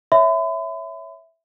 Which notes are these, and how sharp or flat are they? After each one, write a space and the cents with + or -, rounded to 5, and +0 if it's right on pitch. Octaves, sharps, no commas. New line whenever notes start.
C#5 +0 E5 +0 B5 +40